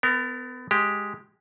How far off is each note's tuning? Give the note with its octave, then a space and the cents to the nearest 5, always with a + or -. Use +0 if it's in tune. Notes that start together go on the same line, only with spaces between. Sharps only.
B3 +30 A#4 -20
G#3 +0 G4 +0